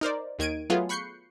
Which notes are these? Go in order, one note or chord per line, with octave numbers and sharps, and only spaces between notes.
D#4 A#4 C5 D5
D#2 D#3 G#6 D7 D#7
F#3 A3 B3 F4 G#4
B5 C#6 F#6 G6 C7 C#7